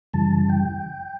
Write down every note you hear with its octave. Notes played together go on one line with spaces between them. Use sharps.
F#2 C#3 E3 G3 A5
G5